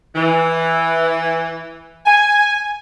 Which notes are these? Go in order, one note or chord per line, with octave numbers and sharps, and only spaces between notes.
E3
G#5